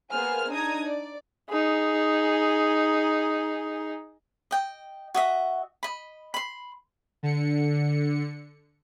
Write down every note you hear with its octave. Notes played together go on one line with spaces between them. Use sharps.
A#3 B3 G#4 C5 G#5 F6
D4 D#4 A#5 D#6 G#6
D5
D#4 G#4
D#5 G5
F#4 D#5 E5
D#5 B5
B5 C6
D3 C#7